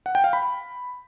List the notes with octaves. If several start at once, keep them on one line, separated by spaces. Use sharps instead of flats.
F#5
G5
F5
B5